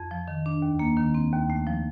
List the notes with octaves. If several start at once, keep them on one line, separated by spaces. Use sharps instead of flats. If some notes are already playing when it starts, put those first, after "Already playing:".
Already playing: F2
F3
D#3
D4
D#2
A#3
D#3
C4
D#2
A3
F3